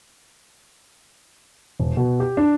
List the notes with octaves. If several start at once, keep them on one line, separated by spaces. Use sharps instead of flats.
E1
B2
G4
D4